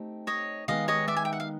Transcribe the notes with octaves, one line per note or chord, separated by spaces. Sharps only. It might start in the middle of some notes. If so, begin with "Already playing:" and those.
Already playing: A3 C4 D#4 G4
C#5 D#5
D#3 G#3 B3 D#4 G#4 D#5 F5
C#5 D#5
D5 E5
G#5
G5
F#5
F5